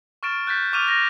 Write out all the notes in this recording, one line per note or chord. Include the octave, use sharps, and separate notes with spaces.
C#6 F6 A6 D7 E7
F#6 G6 A6 B6
C#6 D6 F6 D#7 F7
A#6